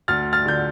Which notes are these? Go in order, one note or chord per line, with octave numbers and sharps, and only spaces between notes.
D2 F6 A6
F6 A6
D3 G6